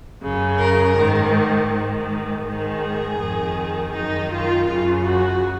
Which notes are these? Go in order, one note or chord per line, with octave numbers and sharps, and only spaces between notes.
F#2 C#3
A#4
G#2 D#3
G#2 D#3
G#2 D#3 G#4
F2 D#3
F#2 D#3 D#4
F4
F#2 C#3 F4
F#4